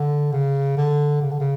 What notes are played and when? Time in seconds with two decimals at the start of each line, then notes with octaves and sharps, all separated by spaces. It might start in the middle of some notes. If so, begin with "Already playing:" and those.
Already playing: D3
0.33 C#3
0.77 D3
1.21 C#3
1.31 D3
1.40 C#3